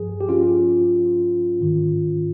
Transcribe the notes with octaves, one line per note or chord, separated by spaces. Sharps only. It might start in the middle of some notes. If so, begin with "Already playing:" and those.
Already playing: G2 F3 G#4
G4
C#4 F4
G#2 D#3